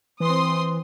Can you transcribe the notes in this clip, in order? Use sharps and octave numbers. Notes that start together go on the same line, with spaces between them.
E3 C4 C6 D#6